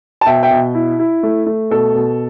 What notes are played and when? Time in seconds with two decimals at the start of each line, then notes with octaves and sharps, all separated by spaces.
0.21 A5
0.26 B2 E5 G5
0.43 E5 G5
0.51 B2
0.75 E4
0.99 E4
1.23 A3
1.46 A3
1.71 B2 A4
1.95 B2